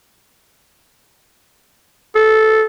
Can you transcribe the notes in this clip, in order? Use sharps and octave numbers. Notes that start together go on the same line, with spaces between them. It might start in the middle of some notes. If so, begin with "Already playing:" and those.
A4